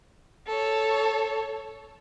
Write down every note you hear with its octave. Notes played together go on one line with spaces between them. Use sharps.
A4 C#5